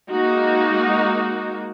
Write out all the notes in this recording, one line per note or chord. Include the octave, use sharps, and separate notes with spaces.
G#3 A#3 D#4 F#4